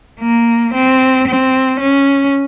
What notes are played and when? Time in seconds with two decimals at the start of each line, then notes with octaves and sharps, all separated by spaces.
0.21 A#3
0.74 C4
1.27 C4
1.80 C#4